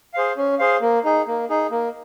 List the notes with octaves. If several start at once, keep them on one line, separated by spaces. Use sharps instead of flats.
G#4 C5 F5
C#4
G#4 C5 F5
A#3
D#4 G#4
A#3
D#4 G#4
A#3